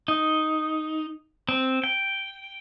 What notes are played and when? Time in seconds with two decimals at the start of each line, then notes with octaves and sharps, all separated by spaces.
0.08 D#4
1.49 C4
1.84 G5